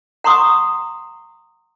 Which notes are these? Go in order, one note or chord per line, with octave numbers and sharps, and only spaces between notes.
F#5 A#5 C6 C#6 D#6